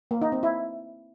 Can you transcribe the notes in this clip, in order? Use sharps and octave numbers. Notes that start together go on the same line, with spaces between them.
A#3
D#4
C4
E4